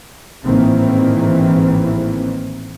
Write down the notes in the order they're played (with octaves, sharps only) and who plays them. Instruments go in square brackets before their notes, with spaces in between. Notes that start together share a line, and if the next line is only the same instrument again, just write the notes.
[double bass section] A1 G#2 D#3 E3 A#3 C4